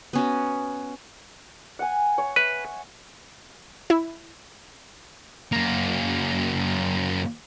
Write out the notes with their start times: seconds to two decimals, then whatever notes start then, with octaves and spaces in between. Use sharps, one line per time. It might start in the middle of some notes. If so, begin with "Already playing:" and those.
0.13 B3 C#4 F#4
1.79 F#5 G#5
2.18 C#5
2.36 B4 E5
3.90 E4
5.52 F#2 A#3